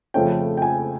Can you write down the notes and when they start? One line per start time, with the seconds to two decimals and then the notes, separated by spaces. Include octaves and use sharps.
0.14 F2 C#3 F3 A3 C#4 G5
0.57 G5
0.62 G#5